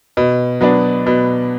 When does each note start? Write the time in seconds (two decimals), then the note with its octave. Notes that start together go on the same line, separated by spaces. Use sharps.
0.17 B2
0.61 F#3 B3 D4
1.07 B2